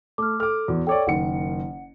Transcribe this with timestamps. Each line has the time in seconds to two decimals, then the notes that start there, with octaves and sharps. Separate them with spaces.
0.18 A3 D6 F6
0.40 A4 D6 F6
0.68 E2 F#4
0.87 A4 C#5 D5 G5 D6
1.07 F#1 D#3 F#5 C#7